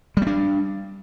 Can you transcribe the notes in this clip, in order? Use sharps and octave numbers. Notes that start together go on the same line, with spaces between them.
G3 B3 D4